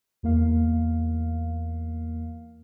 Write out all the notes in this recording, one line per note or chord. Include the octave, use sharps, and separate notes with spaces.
E2 A#3 F5